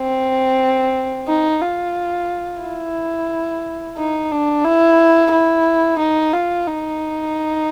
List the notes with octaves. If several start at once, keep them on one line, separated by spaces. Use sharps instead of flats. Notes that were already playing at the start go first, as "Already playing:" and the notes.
Already playing: C4
D#4
F4
E4
D#4
D4
E4
E4
D#4
F4
D#4